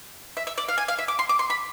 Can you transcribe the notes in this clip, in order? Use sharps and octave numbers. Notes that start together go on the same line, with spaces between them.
E5
E5
D5
F5
G#5
F5
E5
D6
C6
D6
C6
B5